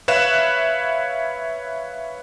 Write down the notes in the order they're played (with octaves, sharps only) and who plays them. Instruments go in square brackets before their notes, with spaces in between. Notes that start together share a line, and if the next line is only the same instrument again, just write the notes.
[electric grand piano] B4 C#5 E5 F5 F#6 E7